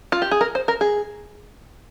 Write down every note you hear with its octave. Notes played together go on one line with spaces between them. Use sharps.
F4
G4
G#4
A#4
C5
A#4
G#4